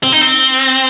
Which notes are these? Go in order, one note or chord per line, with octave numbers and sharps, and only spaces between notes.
C4
D#4
C4